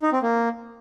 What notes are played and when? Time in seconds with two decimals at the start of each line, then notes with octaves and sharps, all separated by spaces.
0.02 D#4
0.12 C4
0.22 A#3